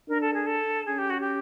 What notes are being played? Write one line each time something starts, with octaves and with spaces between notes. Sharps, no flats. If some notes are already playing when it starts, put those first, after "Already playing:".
D4 A#4
A4
G#4
A4
C#4 G#4
G4
F#4
G4